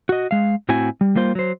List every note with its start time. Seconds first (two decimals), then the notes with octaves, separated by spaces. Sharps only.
0.09 F#4 D#5
0.31 G#3 F5
0.69 A2 C4 E4 F#4 G#5
1.01 G3
1.15 G3 A#3 F4 C5
1.35 F#3 C5